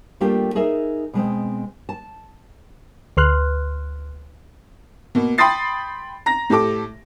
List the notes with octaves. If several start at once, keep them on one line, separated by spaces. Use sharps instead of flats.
G3 A3 A#3 D4 F4 G4
D#4 G#4 A#4 E5
B2 G#3 C4
A5
D2 B4 C6 F6 F#6
B2 A#3
G5 B5 C6 D#6 A6 C7
A#5 A#6
A2 G4 A4 D6